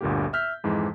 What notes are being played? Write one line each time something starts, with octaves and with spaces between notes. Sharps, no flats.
G1 D2 A#2 D3 A#3 G4
E5 E6 F6 G6 B6
F2 G#2 E3 G#3